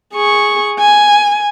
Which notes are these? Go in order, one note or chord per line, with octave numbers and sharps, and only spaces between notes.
G#4 C#6
G#5